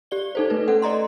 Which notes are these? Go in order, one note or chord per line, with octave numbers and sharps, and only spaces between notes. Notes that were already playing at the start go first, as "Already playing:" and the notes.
G4 D5 G7
D#4 A4 C5
A3 B4
C#4 A4 F#5
D5 D#5 A#5 C6